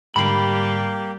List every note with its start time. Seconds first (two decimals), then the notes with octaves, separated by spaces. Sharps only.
0.16 G#2 D3 G3 A#3 G4 B5 C7